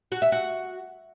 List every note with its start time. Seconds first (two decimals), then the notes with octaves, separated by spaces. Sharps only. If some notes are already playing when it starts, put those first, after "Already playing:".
0.12 F#4
0.22 E5
0.32 F#4